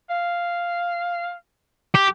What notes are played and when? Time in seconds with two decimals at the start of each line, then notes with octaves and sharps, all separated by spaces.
0.10 F5
1.95 G4